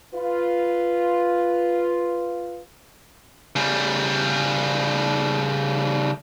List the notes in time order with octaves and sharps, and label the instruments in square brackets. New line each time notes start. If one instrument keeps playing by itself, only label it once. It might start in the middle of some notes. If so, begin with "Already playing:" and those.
[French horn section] F4 B4
[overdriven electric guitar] C#3 G3